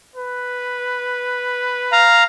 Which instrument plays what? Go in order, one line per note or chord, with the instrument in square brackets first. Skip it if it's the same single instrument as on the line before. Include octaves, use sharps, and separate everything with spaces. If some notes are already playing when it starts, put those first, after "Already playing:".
[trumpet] B4
[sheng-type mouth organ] F5 A#5